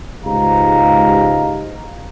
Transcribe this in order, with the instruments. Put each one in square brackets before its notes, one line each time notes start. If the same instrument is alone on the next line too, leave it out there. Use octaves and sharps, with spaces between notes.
[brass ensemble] C#2 G#2 G4 F5 A#5